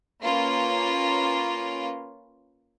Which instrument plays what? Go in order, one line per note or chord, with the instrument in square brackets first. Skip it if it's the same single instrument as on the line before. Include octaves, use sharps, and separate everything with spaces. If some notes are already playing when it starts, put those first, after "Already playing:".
[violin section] A#3 C#4 F4 B4